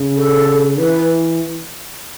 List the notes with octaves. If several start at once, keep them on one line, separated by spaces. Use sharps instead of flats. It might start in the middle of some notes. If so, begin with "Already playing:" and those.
Already playing: C#3
A4
E3 B4